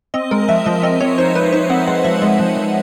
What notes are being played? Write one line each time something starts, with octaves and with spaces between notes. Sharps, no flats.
C4 D#5
G#3 A#4
F3 E5
F3 D#5
C4 D#5
C4 C#5
D#4 C5
D#4 B4
D#4 C5
C4 F#5
G#3 F#5
F3 E5
G#3 D#5
F3
F3